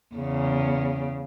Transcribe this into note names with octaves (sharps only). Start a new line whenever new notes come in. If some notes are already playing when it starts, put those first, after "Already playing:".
E2 C#3